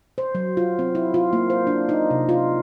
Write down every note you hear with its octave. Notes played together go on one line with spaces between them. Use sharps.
C5
F#3
F4
C4
E4
F4
A#3
C5
D4
D#4
C3
F4